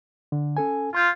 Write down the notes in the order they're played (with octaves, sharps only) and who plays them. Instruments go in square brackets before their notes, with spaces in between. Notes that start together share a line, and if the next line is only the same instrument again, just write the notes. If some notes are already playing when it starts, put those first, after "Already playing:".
[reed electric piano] D3
C#4 A4 G#5
[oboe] F4 [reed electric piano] C6 G6